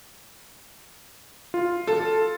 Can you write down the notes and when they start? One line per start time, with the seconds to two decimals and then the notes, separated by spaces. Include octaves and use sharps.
1.54 F4
1.87 A4